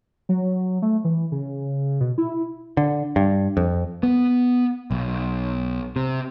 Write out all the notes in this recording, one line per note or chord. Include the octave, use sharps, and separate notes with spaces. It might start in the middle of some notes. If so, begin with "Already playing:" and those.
F#3
A3
E3
C#3
B2
E4
D3
G2
F2
B3
B1
C3